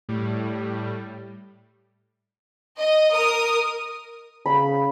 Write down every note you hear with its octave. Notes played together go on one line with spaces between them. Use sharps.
A2 G3
D#5
A#4 D#6
C#3 B5